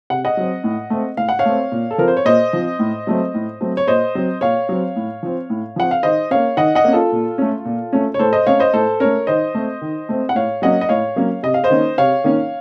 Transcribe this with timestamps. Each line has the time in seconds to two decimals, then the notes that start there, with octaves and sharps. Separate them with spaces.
0.10 C3 F#5
0.25 D#5 F#5
0.37 F#3 C4
0.64 A2
0.90 A3 C4
1.17 A2 F5
1.29 F#5
1.39 C#5 F5
1.45 A3 C4
1.72 A#2
1.91 A4
1.98 F3 C4 A#4
2.08 C5
2.17 C#5
2.25 A#2 C5 D#5
2.53 F3 C4
2.79 A2
3.07 F#3 A3 C4
3.34 A2
3.61 F#3 A3 C4
3.77 C#5
3.87 A#2 C5 D#5
4.15 F#3 C4
4.41 A#2 C#5 F5
4.69 F#3 C4
4.96 A2
5.23 F3 C4
5.50 A2
5.76 F3 C4 F#5
5.91 F5
6.03 D#3 C5 D#5
6.31 A#3 C#4 C#5 F5
6.57 D#3 D#5 F#5
6.75 D#5 F#5
6.84 A#3 C#4
6.93 F4 A4
7.12 A#2
7.38 A3 C#4
7.65 A#2
7.93 A3 C#4
8.14 C#5
8.19 A2 A4 C5
8.32 C5 D#5
8.47 A3 C#4 C#5 F5
8.59 C5 D#5
8.73 A2 A4 C5
9.00 A3 C#4 A#4 C#5
9.27 D#3 C5 D#5
9.55 A3 C4
9.82 D#3
10.09 A3 C4
10.29 F#5
10.35 A2 C#5 F5
10.62 F#3 A#3 C#4 D#5 F#5
10.81 D#5
10.89 A2 C#5 F5
11.16 F#3 A#3 C#4
11.43 C3 D#5
11.54 F5
11.64 C5 D#5
11.70 D#3 A#3 C#4
11.98 C3 C#5 F5
12.24 D#3 A#3 C#4